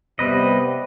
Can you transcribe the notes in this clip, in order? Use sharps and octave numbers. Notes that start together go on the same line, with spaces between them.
C3 G3 B3 B4 D#5